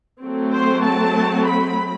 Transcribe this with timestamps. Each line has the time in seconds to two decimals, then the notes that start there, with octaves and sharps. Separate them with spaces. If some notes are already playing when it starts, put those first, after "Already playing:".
0.21 F#3 A3 C4
0.53 C5
0.83 A5
1.46 B5